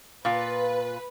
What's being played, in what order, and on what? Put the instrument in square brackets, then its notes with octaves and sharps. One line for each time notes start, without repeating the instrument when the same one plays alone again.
[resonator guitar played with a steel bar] A#2 F4 [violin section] B4